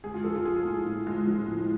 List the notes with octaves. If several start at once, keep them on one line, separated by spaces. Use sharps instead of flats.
G#3 G#4
F4
F3 A4
F4
F3 G#4
A2
A2
G#3
F3
A2